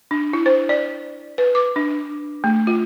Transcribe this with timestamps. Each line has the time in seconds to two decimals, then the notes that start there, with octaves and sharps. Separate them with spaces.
0.11 D4
0.33 E4
0.46 C5
0.69 D5
1.38 B4
1.55 D6
1.76 D4
2.44 A3
2.67 F4